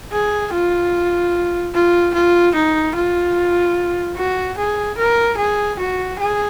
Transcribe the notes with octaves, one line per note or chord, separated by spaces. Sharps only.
G#4
F4
F4
F4
D#4
F4
F#4
G#4
A#4
G#4
F#4
G#4